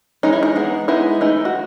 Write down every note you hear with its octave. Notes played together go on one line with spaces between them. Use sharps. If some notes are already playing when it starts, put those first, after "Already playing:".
E3 G#3 C#4 D#4
E4
D#4
G#3 B3 D#4
G#3 B3 D#4 E4
E3 A3 D#4
F#4